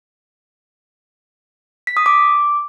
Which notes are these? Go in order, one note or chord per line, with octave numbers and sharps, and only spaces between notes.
B6
D#6
D6